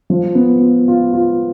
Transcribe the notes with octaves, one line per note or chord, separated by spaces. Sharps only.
F3
B3
F4
F4
F4